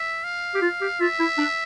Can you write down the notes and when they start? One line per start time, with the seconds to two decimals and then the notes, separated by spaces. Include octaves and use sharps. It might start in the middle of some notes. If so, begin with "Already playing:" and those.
Already playing: E5
0.24 F5
0.55 G4
0.62 F4
0.81 G4
1.00 F4 E5
1.19 E4
1.38 D4